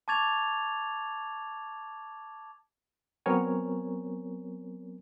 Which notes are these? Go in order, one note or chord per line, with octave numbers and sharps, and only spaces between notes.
A5 C#6 D6 G#6 A6 F7
F#3 B3 C4 A#4 C#5 G#5